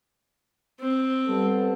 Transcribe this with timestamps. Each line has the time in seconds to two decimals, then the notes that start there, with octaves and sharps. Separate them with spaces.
0.80 C4
1.27 G3 B3 A4